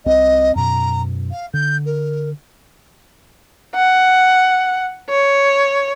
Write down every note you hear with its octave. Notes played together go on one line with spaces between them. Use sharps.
C2 C4 D#5
F#2 B2 A#5
F5
D3 G6
A#4
F#5
C#5